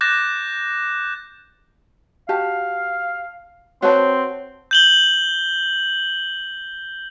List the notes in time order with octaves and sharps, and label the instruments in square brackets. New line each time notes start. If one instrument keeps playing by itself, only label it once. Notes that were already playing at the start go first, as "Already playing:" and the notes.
[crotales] D6 F#6 G6 A6 A#6 E7
[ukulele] F#4 G4 A5 [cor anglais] F5
[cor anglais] C4 [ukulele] F#4 B4 A5 [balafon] C#5
[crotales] G6 F#7 G7